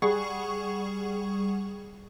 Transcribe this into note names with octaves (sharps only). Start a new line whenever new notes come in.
G3 G#4 F#5 C#6